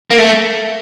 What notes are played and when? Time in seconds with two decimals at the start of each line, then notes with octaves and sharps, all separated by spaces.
0.11 A#3
0.19 A3